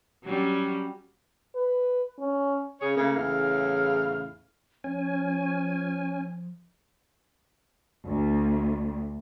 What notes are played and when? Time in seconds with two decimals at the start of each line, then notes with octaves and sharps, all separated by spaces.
0.25 F#3 G3 C#4
1.55 B4
2.19 C#4
2.81 C#3 G#4 C#5
2.96 C#3 A3 A#3
3.16 E2 A2 C#3 E4 F5
4.84 F3 C#4 G#5
8.07 D2